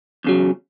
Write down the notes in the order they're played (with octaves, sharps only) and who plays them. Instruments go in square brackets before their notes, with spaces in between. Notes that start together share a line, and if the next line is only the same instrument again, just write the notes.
[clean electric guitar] E2 C#3 F#3